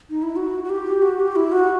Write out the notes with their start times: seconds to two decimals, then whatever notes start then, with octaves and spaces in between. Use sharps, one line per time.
0.10 D#4
0.22 E4
0.36 F#4
0.64 F#4
0.69 G4
1.02 F#4
1.20 G4
1.36 E4
1.52 F#4